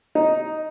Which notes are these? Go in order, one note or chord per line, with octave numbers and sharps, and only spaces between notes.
D#4